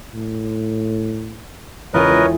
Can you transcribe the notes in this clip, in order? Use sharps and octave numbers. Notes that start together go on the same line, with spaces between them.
A2
E1 C#2 F4 G#4 A#4 B4 C#5 D#5